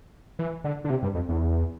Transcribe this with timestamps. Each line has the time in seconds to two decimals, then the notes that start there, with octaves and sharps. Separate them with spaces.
0.39 E3
0.64 D3
0.84 D3
0.90 C3
1.03 G2
1.15 F2
1.29 E2